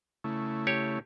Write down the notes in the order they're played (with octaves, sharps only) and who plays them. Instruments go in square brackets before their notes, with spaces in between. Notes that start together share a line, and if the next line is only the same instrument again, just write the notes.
[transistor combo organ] C#3 A3 E4
[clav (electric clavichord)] G4 C#5